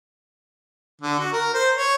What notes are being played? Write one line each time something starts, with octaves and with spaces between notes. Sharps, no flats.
D3
F#4
A#4
C5
C#5